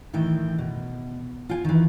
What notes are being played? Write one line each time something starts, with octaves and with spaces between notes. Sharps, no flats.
A2 D#3 E3 G5
B2
F4 G5 G#5
D#3 E3